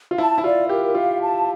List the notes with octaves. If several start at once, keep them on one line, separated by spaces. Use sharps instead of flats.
F4
E4 A5
E4
F4 D5
G4 A#4
F4 F5
A5